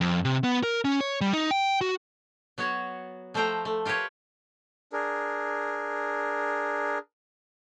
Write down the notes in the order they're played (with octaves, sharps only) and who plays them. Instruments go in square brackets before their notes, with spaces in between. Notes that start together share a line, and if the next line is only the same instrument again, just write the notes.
[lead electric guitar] F2
C3
B3
A#4
C#4
C#5
G3
D#4
G5
F#4
[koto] F#3 B3 F#4 C#5
F3 A3 A4 C5 G5 A#5
A3
F4 G4 A#4 B4 C#5
[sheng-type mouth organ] D4 G#4 A#4